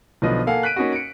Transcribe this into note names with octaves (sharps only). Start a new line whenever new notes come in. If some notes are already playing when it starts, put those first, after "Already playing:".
B1 B2 D3 F3 B4 D#5
A#3 A4 F5 F#5 G#5
F#6 B6 D7 D#7
A#3 C#4 D#4 F#4
C#7 D7